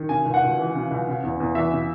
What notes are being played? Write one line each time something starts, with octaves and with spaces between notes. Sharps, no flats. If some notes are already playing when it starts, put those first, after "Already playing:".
Already playing: D#3
C#3 G#5
C#2
F#5
C#2
E3
C#3
C#2
C#3
E2
E2
E3 E5
C#3